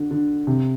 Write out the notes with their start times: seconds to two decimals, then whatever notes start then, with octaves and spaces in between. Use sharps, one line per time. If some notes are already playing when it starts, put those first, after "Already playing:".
Already playing: D3
0.11 D3
0.47 C3